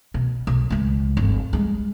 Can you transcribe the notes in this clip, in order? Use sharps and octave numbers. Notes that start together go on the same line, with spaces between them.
B2
B1
C#2 G#3
G1 F2
G3 G#3